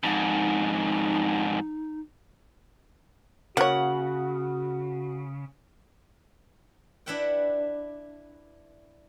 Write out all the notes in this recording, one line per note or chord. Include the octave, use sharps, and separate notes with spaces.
F2 G#2 D#4
C#3 A#3 F#4 C#5 F#5
D4 E4 B4 E5 F#5 G5